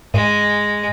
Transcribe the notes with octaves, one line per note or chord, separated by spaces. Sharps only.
G#2 G#3